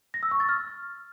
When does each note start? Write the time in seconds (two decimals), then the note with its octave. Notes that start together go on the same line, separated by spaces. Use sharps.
0.14 A#6
0.23 E6
0.31 C#6
0.40 A6
0.49 F6